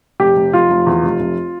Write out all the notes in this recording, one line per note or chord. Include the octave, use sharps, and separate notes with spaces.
F1 G4
F1
F1 F4
F1
E2
F1
F1